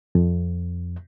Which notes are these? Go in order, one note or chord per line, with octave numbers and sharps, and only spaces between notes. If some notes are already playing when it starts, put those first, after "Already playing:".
F2